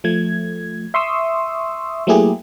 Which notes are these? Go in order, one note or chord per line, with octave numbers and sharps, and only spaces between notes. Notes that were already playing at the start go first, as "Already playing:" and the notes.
F3 A3 G#6
E5 C6 C#6 D#6 E6
F#3 A3 A#3 E4 G4 G#4